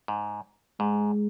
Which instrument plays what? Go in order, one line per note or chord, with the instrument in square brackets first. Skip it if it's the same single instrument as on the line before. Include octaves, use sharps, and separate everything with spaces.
[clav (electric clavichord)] G#2
[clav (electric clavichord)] G#2 [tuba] G#3